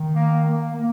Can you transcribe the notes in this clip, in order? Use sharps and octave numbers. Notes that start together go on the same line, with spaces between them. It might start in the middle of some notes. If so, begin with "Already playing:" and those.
Already playing: D#3
A#3
A#3
A#3